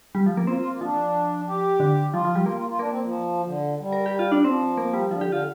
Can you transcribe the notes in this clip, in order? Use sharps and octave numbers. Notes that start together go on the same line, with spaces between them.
G3
F3
A#3
C4 F4
F4
A#3
F3 D4
G4
D3
F3 F4
F3
G3
A#3 F4
F4
F4
A#3 D4
C4
F3
D3
G3
A#4
G4
F4
D4
F3 C4
A#3
G3
D3 F3
G4
D3
F4